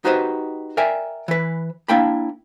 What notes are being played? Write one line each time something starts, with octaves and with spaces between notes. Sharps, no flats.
D#4 F#4 G4 B4 C5 D#5
A#4 D5 E5 G5 G#5
E3 B4
A#3 D4 E4 G5 A5 B5